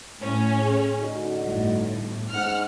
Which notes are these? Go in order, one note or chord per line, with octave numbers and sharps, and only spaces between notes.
A2 C#4
G#4
D3 D#4 F#4
G1 A2
G#2 F#5 F6